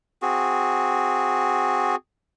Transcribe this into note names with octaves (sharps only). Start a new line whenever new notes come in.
C4 F#4 G#4